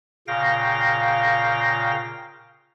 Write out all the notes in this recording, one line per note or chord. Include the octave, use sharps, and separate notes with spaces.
A#2 C#3 F5 G5 A#6